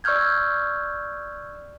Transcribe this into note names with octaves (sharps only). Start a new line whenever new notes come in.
D5 C#6 E6 F6 G6 G#6